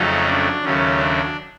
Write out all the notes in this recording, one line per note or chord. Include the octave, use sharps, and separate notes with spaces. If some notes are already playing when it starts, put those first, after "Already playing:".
Already playing: F2 C#3 F#3 A3 C#4 D#4
D4
D#2 C#3 F#3 A3 C#4
D4